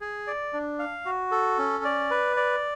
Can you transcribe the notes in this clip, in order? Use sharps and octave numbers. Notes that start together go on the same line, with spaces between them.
G#4
D5
D4
F5
F#4
A4
C#4
D5
B4
D5